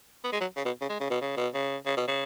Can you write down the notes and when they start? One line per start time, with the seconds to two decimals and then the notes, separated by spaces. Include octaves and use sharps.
0.24 B3
0.32 G#3
0.40 F#3
0.57 C#3
0.65 B2
0.81 C#3
0.89 G#3
1.00 C#3
1.10 B2
1.21 C#3
1.37 B2
1.54 C#3
1.86 C#3
1.97 B2
2.08 C#3